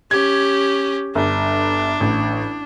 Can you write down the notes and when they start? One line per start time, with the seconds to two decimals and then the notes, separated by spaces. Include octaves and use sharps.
0.11 C#4 G4 G#6
1.15 G1 D4
2.01 A1